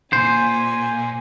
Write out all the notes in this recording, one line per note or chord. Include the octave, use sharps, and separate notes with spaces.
A#2 C5 G#5